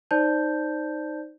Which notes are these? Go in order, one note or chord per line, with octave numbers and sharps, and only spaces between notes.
D#4 C5 D5 A5 G6